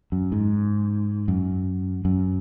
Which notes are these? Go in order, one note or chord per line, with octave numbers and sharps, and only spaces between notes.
F#2
G#2
F#2
F#2